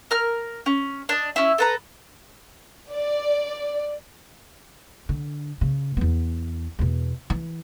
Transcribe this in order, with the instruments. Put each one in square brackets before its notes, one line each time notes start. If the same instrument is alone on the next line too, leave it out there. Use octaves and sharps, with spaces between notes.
[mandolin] A#4 F6
C#4
D4 D#5
C#4 E4
A4 B4 A#5
[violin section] D5
[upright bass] D3
C#3
E2 B3
E2 B2
E3